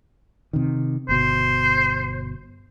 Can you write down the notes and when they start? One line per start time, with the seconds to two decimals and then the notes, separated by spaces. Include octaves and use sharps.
0.53 C3 D#3
1.09 G1 B2 C5